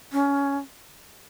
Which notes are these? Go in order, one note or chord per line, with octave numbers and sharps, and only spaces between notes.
C#4